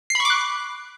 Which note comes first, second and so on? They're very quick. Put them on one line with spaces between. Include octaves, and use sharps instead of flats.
C7 B5 C#6 D6 F#6